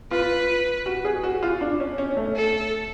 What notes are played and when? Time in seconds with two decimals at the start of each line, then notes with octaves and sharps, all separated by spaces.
0.11 F4 B4
0.86 F#4
1.05 G#4
1.24 F#4
1.43 F4
1.61 D4
1.80 C#4
1.98 C#4
2.17 A3
2.36 A4